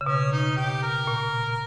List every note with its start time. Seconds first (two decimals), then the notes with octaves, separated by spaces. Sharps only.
0.01 C#3
0.06 B2 C#4
0.32 D#4
0.57 G4
0.82 A#4
1.07 A#2